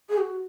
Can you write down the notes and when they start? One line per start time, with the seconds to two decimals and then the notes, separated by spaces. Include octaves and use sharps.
0.09 G#4
0.18 F#4